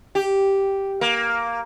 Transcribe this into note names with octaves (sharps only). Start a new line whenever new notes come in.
G4
A#3